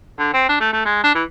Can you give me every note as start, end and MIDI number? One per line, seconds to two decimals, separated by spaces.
0.19 0.34 50
0.34 0.46 60
0.49 0.56 62
0.60 0.71 57
0.73 0.82 57
0.85 0.99 56
1.04 1.12 62
1.15 1.24 52